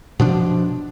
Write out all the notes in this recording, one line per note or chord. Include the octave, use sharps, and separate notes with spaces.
B2 F3 D4